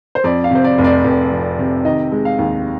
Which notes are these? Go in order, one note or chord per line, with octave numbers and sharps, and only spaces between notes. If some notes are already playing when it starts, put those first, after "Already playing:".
C5
F2 D5
F5
C3 C5
D5
F1
D5
F1
F2
C3
D#3 D#5
G#3
F5
D#2